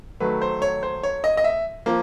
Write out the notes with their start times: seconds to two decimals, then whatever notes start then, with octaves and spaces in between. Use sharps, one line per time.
0.20 D#3 F#3 A3 B4
0.42 C5
0.62 C#5
0.83 C5
1.03 C#5
1.24 D#5
1.37 D#5
1.44 E5
1.86 F3 A#3